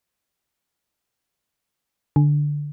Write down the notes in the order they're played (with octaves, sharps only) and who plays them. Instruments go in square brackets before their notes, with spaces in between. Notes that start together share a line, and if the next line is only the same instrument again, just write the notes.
[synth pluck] D3